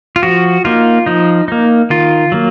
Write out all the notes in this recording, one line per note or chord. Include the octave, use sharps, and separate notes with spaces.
F4
F3 F#4
A#3 D#4 F4
F3 D#4
A#3 D#4
D#3 F4
F#3 A#3